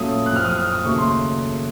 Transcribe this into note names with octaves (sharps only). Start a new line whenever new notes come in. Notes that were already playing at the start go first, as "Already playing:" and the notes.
Already playing: A#2 F#3 A3 C#4 F4 D#6
F#6
F#2 F3 C4 F6
D#6
F6
D#6
D#2 C#3 F#3 A3 C#6
C6